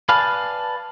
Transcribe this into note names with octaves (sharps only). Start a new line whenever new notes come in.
B4 D5 F5 G#5 A5